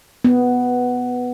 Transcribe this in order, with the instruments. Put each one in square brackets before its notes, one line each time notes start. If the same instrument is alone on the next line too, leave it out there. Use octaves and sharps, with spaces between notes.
[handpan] B3